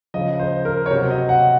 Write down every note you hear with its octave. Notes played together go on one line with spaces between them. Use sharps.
C#3 F3 D#5
C5
A#4
C#5
C3 F#3 C5
D#5
F#5